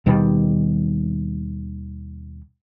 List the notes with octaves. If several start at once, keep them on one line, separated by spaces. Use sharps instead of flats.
D#2 B2 D#3 G3